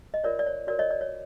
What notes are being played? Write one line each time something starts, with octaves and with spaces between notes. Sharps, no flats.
D#5
F4 A#4 C#5 D5
D5
C#5
F#4 A#4 C#5 D5
C#5 D#5
D5
C#5